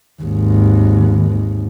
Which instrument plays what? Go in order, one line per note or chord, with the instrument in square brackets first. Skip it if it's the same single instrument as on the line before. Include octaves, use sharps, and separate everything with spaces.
[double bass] G#1 D#2